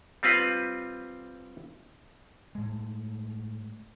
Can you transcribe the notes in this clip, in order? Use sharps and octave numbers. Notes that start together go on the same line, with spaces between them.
G3 C4 F4 B4
A2 G#3